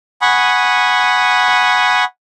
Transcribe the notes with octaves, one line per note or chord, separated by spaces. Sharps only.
F#5 G#5 B5 C#6 D#6